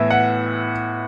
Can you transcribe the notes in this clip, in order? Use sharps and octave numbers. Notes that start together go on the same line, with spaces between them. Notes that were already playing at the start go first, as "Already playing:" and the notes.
Already playing: A2 E3 B3 E5
F#5